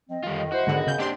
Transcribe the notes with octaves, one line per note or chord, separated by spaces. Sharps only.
F3 C4 D#5
F2 D3 D#3 G3 F4
E4 F#4 C5
G#2 D3 D#3 B3 G#4
C#3 G6
C4 D4 G4 C6